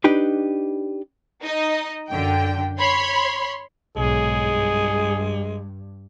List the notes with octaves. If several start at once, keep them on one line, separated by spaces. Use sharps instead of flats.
D4 D#4 G4 B4
D#4 D#5
F#2 D3 G5
C#5 B5 C6
B1 G#2 G#3 G#4
G2